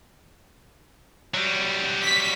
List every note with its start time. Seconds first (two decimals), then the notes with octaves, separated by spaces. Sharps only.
1.34 F#3 G3
2.03 B6